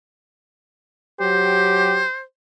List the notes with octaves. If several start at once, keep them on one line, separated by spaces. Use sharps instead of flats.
F#3 G4 C5